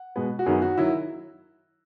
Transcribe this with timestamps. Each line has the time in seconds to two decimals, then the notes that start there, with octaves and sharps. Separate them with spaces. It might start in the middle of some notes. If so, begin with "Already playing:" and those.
Already playing: F#5
0.16 B2 G#3 B3
0.39 F#4
0.46 F#2 D#3 F#3 B3 G#4
0.62 F#4
0.78 D#3 F#3 E4